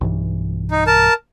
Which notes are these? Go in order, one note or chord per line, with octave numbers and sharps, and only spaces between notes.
B1 G2 E3
D#4
A#4 A5